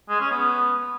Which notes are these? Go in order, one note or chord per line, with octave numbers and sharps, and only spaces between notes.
G#3
C#4
B3